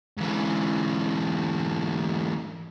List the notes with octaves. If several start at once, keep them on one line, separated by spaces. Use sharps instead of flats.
G#2 E3